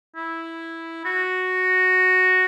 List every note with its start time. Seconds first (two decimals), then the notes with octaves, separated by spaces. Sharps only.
0.16 E4
1.05 F#4